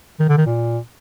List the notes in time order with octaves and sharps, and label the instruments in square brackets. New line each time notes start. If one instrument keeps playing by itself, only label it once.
[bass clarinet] D#3
D3
D#3
A#2